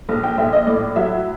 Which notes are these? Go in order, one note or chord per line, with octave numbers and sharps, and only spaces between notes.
A#1
G5
A#1 E5
D#5
A2 D5
F#3 E5